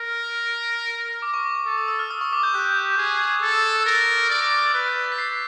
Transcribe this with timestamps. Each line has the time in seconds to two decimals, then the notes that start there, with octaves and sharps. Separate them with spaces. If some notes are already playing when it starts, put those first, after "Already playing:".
Already playing: A#4
1.22 D6
1.34 C#6
1.45 D6
1.55 C#6
1.66 A4 D6
1.78 D#6
1.88 E6
1.99 F6
2.11 D#6
2.21 C#6
2.33 D6
2.43 G6
2.54 G4 F#6
2.98 G#4
3.42 A4
3.81 E6
3.86 A#4 F6
4.30 D5 E6
4.41 D6
4.58 F6
4.63 E6
4.74 B4 F6
4.88 G6
5.04 A6
5.12 B6
5.18 C7